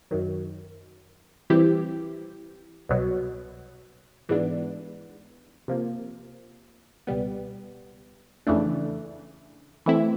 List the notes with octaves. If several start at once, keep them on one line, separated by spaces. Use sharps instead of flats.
F#2 D#3 F#3
E3 G3 C4 E4 G4
C2 B2 F#3
G#2 E3 G#3 B3 D4
C3 F3 A#3
C#2 B2 G3 B3
F2 C#3 E3 A3 D4
E3 A3 C4 E4